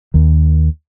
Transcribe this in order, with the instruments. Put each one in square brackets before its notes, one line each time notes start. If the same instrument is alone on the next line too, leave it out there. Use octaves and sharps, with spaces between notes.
[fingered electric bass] D#2 D#3